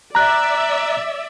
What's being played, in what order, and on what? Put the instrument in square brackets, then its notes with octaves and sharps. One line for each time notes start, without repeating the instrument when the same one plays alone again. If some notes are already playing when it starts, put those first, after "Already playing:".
[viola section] D5 E5 [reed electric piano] A#5 F#6